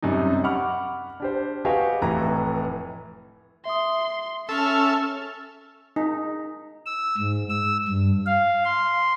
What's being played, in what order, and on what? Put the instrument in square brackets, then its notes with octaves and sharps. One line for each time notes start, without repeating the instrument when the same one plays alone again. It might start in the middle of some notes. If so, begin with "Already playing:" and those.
[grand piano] F#2 C3 G3 D#4
F#5 B5 C#6 D6 F6
D4 G4 C5
F#4 G4 B4 D#5 F5 G#5
F1 A2 E3 B4 A#5
[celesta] E5 D#6 [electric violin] C6
[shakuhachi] C#4 [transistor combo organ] A4 E5 [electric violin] C#6 F6
[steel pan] D#4
[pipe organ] E6
G#2
E6
G2
F5
C6